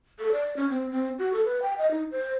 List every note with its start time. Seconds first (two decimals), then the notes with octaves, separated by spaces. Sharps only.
0.19 A4
0.32 D5
0.57 C#4
0.69 C4
0.91 C4
1.19 F#4
1.33 A4
1.45 B4
1.62 G5
1.78 D#5
1.91 D#4
2.11 C5